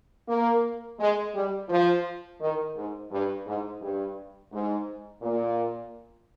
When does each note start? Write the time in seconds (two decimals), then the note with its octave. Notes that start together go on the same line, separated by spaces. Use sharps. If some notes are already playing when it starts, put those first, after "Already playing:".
0.28 A#3
0.99 G#3
1.34 G3
1.69 F3
2.40 D#3
2.76 G#2
3.11 G2
3.46 G#2
3.82 G2
4.52 G#2
5.22 A#2